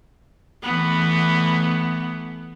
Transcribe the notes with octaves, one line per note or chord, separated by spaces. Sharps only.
E3 A3 B3